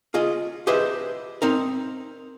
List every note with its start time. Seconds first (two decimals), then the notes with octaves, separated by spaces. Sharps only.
0.14 F4 G#4 D#5
0.67 G4 G#4 B4 C5 D#5 E5
1.42 C4 D#4 A#4